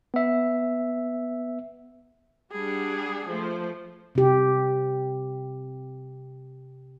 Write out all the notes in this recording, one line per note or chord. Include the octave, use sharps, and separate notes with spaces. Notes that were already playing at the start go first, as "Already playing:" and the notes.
B3 E5
G3 D4 G#4 F#5
F3 A3 C5
C3 G4